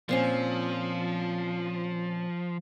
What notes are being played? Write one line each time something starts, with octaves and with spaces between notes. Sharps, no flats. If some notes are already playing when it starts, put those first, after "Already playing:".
A#2 F3 C4 C#4